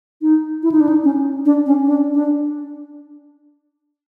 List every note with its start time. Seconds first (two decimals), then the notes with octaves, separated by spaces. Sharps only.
0.22 D#4
0.63 E4
0.72 D#4
0.80 D4
0.89 D#4
1.04 C#4
1.45 D4
1.66 C#4
1.86 D4
2.14 D4